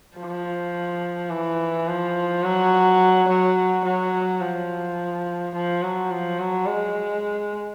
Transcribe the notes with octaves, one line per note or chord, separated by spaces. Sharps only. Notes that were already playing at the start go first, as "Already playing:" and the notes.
F3
E3
F3
F#3
F#3
F#3
F3
F3
F#3
F3
F#3
G#3